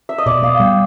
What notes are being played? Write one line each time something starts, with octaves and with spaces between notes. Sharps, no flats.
E5
D#5
B2 D5
B3 F5
G3 G5